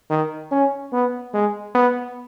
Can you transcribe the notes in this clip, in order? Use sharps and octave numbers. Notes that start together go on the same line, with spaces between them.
D#3
C#4
B3
G#3
B3